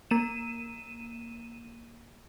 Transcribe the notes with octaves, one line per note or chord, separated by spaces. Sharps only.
A#3 D#7 E7